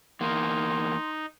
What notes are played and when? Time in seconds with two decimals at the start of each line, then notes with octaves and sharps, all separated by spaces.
0.21 E2 A#3 D#4 C6